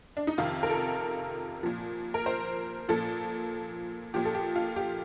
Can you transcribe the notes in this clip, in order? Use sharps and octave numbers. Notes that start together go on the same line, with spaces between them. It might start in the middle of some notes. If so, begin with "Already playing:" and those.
D4
D#4
F2 C3 D#3 F4
A#4
A4
A#2 F3
A#4
C5
A#2 F3 A4
A#2 F3 G4
A4
G4
F4
G4